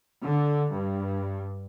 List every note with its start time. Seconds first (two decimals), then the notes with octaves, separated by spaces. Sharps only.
0.22 D3
0.71 G2